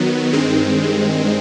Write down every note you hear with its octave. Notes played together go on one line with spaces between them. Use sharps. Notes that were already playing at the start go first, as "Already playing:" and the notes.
Already playing: D#3 F#3 B3
G2 D#3 G#3 C4